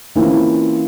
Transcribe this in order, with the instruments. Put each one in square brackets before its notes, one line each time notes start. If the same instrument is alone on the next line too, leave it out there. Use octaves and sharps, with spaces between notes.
[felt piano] E3 A#3 C4 C#4 E4 F4